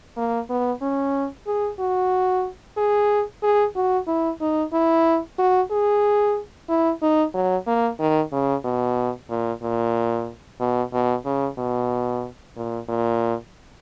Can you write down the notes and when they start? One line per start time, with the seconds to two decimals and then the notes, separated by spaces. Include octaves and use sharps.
0.17 A#3
0.49 B3
0.81 C#4
1.47 G#4
1.79 F#4
2.77 G#4
3.43 G#4
3.76 F#4
4.07 E4
4.41 D#4
4.73 E4
5.38 F#4
5.71 G#4
6.69 E4
7.02 D#4
7.34 F#3
7.67 A#3
7.99 D#3
8.32 C#3
8.64 B2
9.29 A#2
9.62 A#2
10.60 B2
10.93 B2
11.25 C#3
11.58 B2
12.56 A#2
12.89 A#2